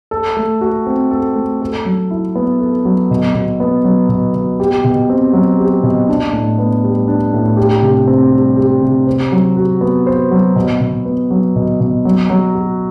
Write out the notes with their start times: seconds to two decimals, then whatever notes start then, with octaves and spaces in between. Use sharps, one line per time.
0.11 A4
0.37 A3
0.61 F#4
0.87 C4
1.11 A4
1.36 A3
1.61 A4
1.85 F#3
2.11 E4
2.35 B3
2.61 A4
2.85 F#3
3.11 B2
3.35 B2
3.60 B3
3.84 F#3
4.09 B2
4.35 B2
4.60 G4
4.85 B2
5.10 C4
5.33 F#3
5.59 G4
5.83 B2
6.08 D4
6.33 A2
6.59 B3
6.83 G3
7.08 D4
7.33 A2
7.57 G4
7.82 C3
8.07 C4
8.32 G3
8.57 G4
8.82 C3
9.07 C5
9.32 F#3
9.57 F#4
9.81 B3
10.07 C5
10.31 F#3
10.56 B2
10.81 B2
11.05 B3
11.31 F#3
11.56 B2
11.80 B2
12.05 F#3
12.30 F#3
12.55 F#4